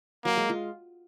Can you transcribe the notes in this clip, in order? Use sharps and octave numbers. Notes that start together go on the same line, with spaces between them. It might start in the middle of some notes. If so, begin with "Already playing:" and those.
F#3 A#3
G#3
F4